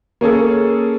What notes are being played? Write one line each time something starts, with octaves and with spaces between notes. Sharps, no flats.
A#3 C#4 G#4 A4